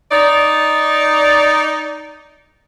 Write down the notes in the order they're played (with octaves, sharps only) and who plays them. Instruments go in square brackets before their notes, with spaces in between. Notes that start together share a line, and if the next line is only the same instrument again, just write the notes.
[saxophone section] D#4 D5